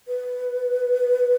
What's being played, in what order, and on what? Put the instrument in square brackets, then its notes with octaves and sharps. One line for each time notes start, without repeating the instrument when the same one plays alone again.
[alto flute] B4